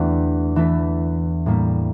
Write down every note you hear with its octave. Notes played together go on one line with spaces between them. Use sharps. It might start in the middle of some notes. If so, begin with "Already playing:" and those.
Already playing: E2 E3 A3 D4 G4
E3 A3 E4 A4
A2 G3 A#3 E4